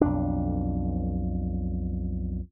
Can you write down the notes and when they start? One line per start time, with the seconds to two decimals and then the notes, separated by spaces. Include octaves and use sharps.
0.01 B1 F2 D4